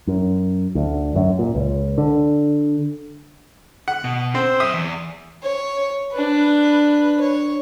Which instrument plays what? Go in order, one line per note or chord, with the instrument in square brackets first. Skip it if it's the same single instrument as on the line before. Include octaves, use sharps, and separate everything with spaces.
[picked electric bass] F#2
D2
F#2
A#2
C#2
D3
[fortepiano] F#5
[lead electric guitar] B2
[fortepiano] C4 [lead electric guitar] C5
[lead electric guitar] F#2 E5 [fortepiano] D#6
[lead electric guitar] E2
[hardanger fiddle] C#5
D4 B4
C#5